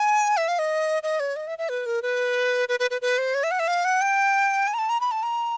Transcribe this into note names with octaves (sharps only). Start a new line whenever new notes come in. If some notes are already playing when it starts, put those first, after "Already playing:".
Already playing: G#5
E5
F5
D#5
D#5
C#5
D#5
E5
E5
B4
A#4
B4
B4
B4
B4
B4
C5
C#5
E5
F#5
E5
F5
F#5
G5
G#5
A#5
A5
A#5
B5
A5
A#5